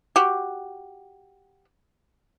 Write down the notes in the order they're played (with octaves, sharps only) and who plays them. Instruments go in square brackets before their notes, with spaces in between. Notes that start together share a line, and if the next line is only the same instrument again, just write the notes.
[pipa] F#4 G4